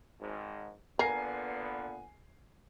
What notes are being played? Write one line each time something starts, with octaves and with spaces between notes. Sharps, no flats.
G#1 G#2
A#2 D3 B3 A#4 G#5 C7